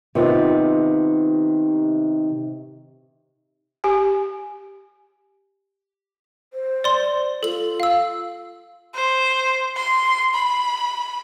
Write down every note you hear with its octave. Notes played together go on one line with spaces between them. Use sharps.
C3 D#3 B3 C4 F4
G4 G#5
C5
D5 C6
F4 A4 F#7
F5 E6
C5
C6
B5